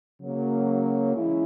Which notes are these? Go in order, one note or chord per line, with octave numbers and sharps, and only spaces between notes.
C#3 F#3 A#3
E3 G#3 C#4 E4